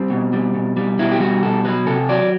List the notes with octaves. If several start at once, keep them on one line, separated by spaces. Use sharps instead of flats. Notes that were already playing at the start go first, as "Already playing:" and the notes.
Already playing: G3 C4
B2
G3
B2
G3
B2 E4
G4
G3 F#4
B2 A4
F#3 B4
C3 A4
F#3 D5